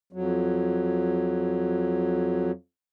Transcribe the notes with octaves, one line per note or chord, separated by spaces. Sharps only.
F2 F#3